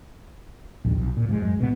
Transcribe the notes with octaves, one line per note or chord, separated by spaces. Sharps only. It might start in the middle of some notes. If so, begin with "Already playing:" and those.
A#1 D#2 D#3
B1
A#2
G#2 F3 G#3
F#2 G#3
A1 B2 G#3 B3